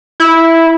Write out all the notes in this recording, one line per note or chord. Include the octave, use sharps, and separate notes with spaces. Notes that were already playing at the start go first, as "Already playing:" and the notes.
E4